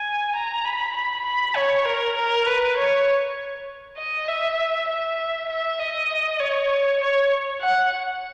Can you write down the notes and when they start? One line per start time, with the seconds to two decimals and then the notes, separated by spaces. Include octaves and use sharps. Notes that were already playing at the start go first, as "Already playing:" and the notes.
Already playing: G#5
0.35 A#5
0.65 B5
0.96 B5
1.25 B5
1.56 C#5
1.85 A#4
2.17 A#4
2.47 B4
2.77 C#5
3.97 D#5
4.28 E5
4.89 E5
5.48 E5
5.79 D#5
6.40 C#5
7.00 C#5
7.61 F#5